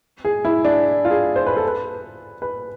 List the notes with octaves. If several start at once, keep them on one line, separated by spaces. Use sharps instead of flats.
G#4
E4
D4
F4
G#4
C5
B4
A4
B4
B4